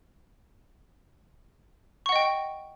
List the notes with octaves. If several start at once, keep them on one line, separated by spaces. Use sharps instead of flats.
D#5 F#5 G5 C#6